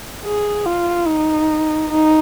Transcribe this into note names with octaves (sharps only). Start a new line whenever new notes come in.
G#4
F4
D#4
D#4